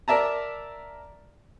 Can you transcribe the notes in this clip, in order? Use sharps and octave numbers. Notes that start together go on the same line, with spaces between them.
A#4 D5 E5 A5 A#5